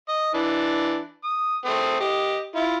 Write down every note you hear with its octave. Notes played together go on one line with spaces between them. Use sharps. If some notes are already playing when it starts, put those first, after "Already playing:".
D#5
E3 D4
D#6
A3 C4 D#6
G4 D#5
E4 F4